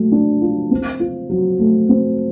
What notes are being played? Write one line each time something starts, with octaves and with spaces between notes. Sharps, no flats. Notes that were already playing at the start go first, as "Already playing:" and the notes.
Already playing: F#3 A3
D4
F4
C4
F4
F#3
A3
C4